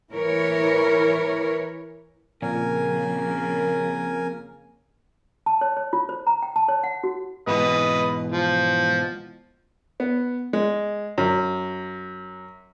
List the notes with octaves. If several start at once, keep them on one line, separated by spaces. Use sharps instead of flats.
E3 E4 A#4 B4 C#5
F2 A#2 C#3 A#3 A#4 G#5
A5
C#5
C#5
F4
C5
A#5
G5
A5
C#5
F#5
F#4
G#2 B2 E3 B4 D#5
F3
B3
G#3
F#2